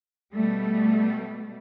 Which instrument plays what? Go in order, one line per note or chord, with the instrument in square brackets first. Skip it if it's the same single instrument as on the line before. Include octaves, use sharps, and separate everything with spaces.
[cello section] B2 G3 A3